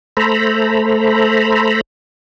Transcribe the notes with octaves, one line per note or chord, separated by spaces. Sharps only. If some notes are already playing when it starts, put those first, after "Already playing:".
A3 A4 C5 A#5 B5